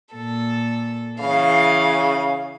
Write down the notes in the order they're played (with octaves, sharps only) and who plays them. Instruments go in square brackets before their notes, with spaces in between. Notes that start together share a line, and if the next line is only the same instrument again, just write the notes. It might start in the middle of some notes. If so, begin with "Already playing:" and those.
[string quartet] A#2 A4
[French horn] C#3 [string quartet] E3 F5